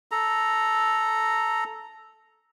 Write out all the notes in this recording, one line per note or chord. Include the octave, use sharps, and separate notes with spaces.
A4 A#5